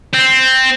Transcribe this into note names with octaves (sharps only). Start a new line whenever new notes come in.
C4